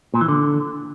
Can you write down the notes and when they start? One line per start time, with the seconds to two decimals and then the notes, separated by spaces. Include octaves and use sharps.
0.14 A#2
0.21 E3
0.28 D3